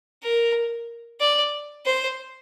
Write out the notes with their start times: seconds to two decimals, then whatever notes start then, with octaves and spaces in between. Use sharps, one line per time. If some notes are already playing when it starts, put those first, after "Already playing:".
0.23 A#4
1.20 D5
1.86 C5